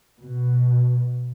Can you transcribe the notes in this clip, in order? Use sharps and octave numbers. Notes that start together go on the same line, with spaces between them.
B2